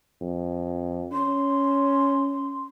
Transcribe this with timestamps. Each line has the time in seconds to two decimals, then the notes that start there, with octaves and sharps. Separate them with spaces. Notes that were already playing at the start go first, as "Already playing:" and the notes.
0.21 F2
1.12 C#4 C6